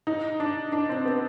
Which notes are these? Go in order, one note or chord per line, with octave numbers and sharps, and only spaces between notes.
D#4
D4
D4
C4
B3